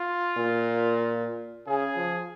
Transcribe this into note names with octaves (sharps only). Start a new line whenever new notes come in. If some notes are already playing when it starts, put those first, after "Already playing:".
Already playing: F4
A#2
C#3 G#4
F3